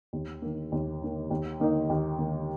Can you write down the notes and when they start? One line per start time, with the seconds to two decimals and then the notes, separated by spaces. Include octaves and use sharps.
0.13 D#2
0.42 D#3 A#3
0.72 D#2
1.02 D#3 A#3
1.31 D#2
1.60 D#3 A#3 D#4
1.90 D#2
2.18 D#3 A#3 D#4